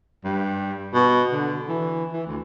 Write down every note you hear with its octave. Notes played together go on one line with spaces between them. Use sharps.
G2
B2
D3
E3
E3
D2